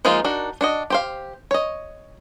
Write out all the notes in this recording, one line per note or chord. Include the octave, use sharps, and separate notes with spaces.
F3 G#3 A#3 D#4 F4
D4 D#4 F#4 A#4
D4 F#4 D#5
G4 C5 F5
C#5 D#5